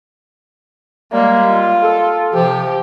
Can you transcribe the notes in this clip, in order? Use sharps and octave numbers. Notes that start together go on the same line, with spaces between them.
G3 G#3 A#3
F4
A4
C3 F3 G4